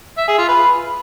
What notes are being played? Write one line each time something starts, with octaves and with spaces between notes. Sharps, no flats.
E5
G#4
F4
B4